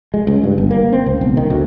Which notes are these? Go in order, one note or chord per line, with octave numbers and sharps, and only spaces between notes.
G#3
C#2
G2
G1
A#3
C4
C#2
B1
D#3
D2